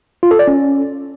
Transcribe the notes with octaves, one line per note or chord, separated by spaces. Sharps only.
F4
A4
D5
C#4